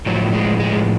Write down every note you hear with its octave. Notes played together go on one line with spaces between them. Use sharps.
A2 F3 F#3
G#3
G#3